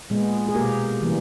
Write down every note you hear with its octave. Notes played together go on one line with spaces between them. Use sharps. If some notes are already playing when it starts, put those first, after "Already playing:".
A#2 G#3 B3
G#4
B2 A#3 G4 A#4
C#3 E3 G3 A#3